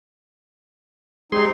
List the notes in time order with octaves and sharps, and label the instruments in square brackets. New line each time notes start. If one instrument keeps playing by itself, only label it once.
[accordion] G3 C4 D#4 [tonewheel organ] G#3 G#4 C6